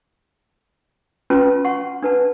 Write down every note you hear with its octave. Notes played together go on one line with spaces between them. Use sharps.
C#4 F4 B4 A5 C6
F#5 C6 C#6
D4 B4 A5